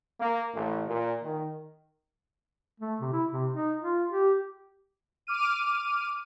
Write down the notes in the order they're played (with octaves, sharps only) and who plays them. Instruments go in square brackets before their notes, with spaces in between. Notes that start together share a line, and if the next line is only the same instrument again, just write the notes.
[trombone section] A#3
A1
A#2
D#3
[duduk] A3
C3
E4
C3
D#4
F4
G4
[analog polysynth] D6 F6 D#7